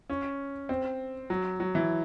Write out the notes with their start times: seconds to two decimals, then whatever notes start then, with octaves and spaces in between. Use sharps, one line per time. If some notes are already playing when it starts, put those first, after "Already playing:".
0.10 C#4
0.69 C4
1.30 F#3
1.60 F#3
1.75 E3